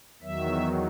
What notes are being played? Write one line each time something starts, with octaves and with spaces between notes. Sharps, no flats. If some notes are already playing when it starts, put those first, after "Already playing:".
E2 D#3 F#3 E5